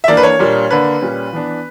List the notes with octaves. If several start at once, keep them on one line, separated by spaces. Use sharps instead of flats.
E5
E3 A#3 D4 D5
B4
C#5
A#2 G3 A#3 D4
D3 A#3 D4 B4
A#2 G3 C#4
E3 B3 D4